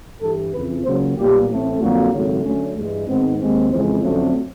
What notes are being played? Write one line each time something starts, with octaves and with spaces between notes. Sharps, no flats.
G2 E3 G3 A4
F2 C#3 E3 B4
C#2 C#3 F#3 A#3 C5
B1 A#2 G3 B3 G4
A1 A2 E3 A3 C4
F2 D3 F#3 A#3 F#4
G#1 F#2 C#3 F#3 A3 C#4
D2 D3 F#3 A3 C#4
G2 E3 G#3
G#2 D#3 G#3 B3 C4
D#2 D#3 G#3 C4
F2 C#3 E3 G#3 C4
F2 D3 F#3 A3 C4 C#4